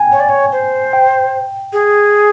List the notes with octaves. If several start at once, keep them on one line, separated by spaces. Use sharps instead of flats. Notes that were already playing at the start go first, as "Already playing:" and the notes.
Already playing: G5 G#5
C#5
D5
C#5
C5
G5
G#4